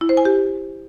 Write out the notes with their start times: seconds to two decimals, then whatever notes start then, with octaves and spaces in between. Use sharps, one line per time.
0.01 E4
0.09 C5
0.17 G#5
0.25 G4